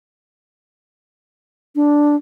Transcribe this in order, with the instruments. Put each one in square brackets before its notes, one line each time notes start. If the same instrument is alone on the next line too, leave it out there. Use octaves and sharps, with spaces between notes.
[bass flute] D4